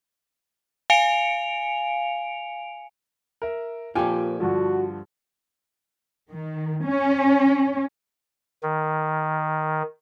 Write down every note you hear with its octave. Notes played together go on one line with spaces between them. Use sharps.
F5 G#5 C#7 D7 F7
A#4 E5
A#2 F3 F4 G4 A4 G5 G#5 D6
G2 D3 F3 F#4
D#3
C#4
D#3